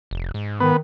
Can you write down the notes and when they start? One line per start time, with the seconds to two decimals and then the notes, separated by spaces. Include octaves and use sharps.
0.11 F1
0.34 G#2
0.60 D#3 B3